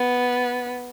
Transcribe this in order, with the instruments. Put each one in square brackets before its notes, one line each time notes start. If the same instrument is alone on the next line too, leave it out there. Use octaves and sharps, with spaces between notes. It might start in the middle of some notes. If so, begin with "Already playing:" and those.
Already playing: [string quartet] B3